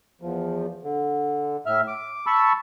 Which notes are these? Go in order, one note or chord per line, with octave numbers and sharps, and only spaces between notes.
E2 F3
D3
A2 E5 F6
D6
A5 B5 C#6 E6